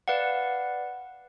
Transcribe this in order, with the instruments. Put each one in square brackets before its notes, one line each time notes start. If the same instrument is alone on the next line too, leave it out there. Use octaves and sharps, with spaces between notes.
[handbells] B4 D5 F5 F#5